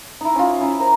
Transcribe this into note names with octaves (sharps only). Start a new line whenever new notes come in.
D#4 E4
C#4 F4
C#4 E4 E5
A#4 C5 A#5